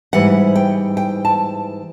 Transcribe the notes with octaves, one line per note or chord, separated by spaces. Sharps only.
G#2 E3 G3 F#5
G5
G5
A5